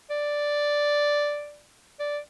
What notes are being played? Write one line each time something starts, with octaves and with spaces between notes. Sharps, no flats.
D5
D5